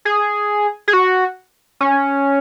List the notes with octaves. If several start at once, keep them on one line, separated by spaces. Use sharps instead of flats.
G#4
G#4
F#4
C#4